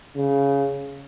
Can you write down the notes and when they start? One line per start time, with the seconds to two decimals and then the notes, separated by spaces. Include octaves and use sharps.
0.16 C#3